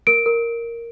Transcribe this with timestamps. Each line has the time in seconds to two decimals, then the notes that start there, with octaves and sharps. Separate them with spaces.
0.07 A#4 D7
0.26 A#4